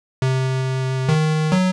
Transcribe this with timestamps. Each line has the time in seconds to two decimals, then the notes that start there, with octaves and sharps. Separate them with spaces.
0.22 C3
1.09 D#3
1.52 F#3